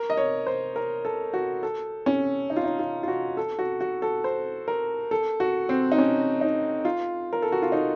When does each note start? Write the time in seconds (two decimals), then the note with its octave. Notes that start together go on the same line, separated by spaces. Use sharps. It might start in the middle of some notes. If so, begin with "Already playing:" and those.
Already playing: A#4
0.10 D#5
0.17 C#5
0.47 C5
0.76 A#4
1.05 A4
1.34 F#4
1.63 A4
2.06 C#4
2.50 D#4
2.57 F4
2.64 D#4
2.79 F4
3.03 F4
3.08 F#4
3.37 A4
3.59 F#4
3.81 F#4
4.02 A4
4.24 C5
4.68 A#4
5.11 A4
5.40 F#4
5.69 C4
5.92 D#4
5.98 C#4
6.41 D#4
6.85 F4
7.33 A#4
7.42 A4
7.52 F#4
7.62 F4
7.72 D#4